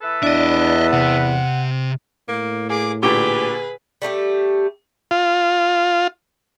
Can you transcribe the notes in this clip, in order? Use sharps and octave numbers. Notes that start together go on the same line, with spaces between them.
E3 A4 B4
E2 D4 D#5 E5
C3 F#5
A2 A#3
A#3 G#4 D6
A#2 D3 G4 G#4 B4 C#6
G3 A3 D#4 G4
F4